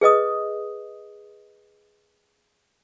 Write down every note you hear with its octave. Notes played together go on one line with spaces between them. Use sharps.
G#4 B4 D#5 D#6